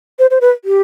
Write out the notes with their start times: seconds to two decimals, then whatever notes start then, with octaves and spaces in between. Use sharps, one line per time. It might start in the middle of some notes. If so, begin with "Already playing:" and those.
0.19 C5
0.31 C5
0.41 B4
0.65 G4